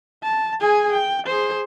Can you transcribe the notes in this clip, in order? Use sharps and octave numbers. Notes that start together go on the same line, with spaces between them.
A5
G#4 G#5
G5
G#4 C5